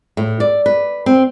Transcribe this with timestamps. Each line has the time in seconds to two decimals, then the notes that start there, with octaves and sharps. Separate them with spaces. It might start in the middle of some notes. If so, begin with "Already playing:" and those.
0.17 A2
0.40 D5
0.66 B4
1.06 C4